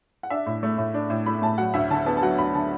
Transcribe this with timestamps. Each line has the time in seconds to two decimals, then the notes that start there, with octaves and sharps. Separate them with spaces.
0.23 F#5
0.30 D4 E5
0.46 A2
0.63 A3
0.78 A2
0.94 D4
1.10 A2
1.26 A3 B5
1.42 A2 A5
1.58 F#3 F#5
1.74 D2 E5
1.90 D3 A5
2.06 B3 A5
2.17 A5
2.22 F#3 F#5
2.38 D2 B5
2.54 D3 A5